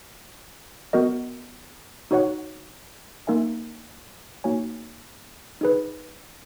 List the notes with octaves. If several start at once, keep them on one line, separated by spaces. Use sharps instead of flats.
B3 F#4 A#4 D#5
D#4 F#4 C#5 F#5
A#3 D#4 A#4 E5 G#5
A#3 D#4 F#4 C#5 G#5
D#4 G#4 B4